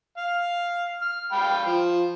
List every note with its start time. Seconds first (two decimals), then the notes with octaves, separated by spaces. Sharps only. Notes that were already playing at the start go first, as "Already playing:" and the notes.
0.18 F5
1.02 F6
1.32 F5 G5 B5
1.66 F3